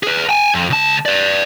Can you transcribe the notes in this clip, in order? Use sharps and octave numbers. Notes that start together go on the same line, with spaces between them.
G#4 B4
G5 G#5
F2
C#2 A5
B4 D5